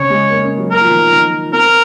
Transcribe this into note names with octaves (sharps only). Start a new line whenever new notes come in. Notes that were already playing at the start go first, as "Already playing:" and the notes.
Already playing: C#3 C#5
G#3
A#3
C#4
F#3
A#3 A#4
F3
D#3
F3
D#3
C4 A#4